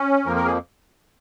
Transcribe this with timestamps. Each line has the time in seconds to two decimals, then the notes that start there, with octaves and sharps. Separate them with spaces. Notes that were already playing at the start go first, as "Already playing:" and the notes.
Already playing: C#4
0.26 F2 F3 A#3 A#4
0.36 A#4
0.45 G#4